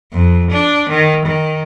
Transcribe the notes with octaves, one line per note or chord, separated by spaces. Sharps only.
F2
D4
D#3
D#3